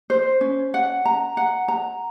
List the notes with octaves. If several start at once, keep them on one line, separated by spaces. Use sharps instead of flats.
C5
C#4
F#5
A#5
F#5
A#5